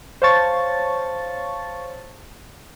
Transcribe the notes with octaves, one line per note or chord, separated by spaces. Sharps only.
C5 C#5 F5 A5 C#6 A6